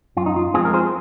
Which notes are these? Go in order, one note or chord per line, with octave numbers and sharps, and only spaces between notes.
F#2 F4
D#4
F4
F3 G#3 C4 F4 G#4
A#4
G#4 C5